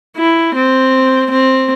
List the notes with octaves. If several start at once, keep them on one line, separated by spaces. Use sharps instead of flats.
E4
C4
C4